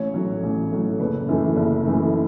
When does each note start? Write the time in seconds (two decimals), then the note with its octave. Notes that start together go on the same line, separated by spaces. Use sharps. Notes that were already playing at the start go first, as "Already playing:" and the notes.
Already playing: A1 C#5
0.14 A2 F#3
0.43 A1
0.72 A2 F#3
1.00 F#1 B4
1.28 F#2 E3 A3
1.56 F#1
1.84 F#2 E3 A3